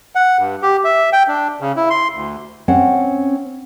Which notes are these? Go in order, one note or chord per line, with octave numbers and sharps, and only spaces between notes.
F#5
G2
G4
E5
G5
D4
C#3
E4
C6
D2
C4 C#4 F#5